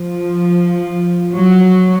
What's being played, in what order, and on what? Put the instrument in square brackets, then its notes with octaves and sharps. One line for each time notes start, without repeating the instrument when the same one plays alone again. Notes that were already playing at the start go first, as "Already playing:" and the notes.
Already playing: [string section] F3
F#3